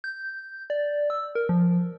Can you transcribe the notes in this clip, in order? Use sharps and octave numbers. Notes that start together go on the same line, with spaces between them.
G6
D5
E6
A#4
F3